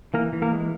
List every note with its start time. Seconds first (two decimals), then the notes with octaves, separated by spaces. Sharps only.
0.14 E3 A#3 A#4
0.33 E3
0.42 A#3 A#4
0.52 G#3